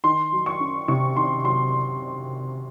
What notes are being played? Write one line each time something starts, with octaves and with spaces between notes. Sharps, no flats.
D#3 C6
F#3
C#6
C#4
C3 C#6
D#3 C6
F#3 C6